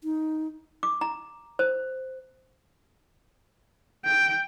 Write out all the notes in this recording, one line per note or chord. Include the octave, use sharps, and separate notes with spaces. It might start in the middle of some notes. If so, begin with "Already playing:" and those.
D#4
D6
A#5
C5
G5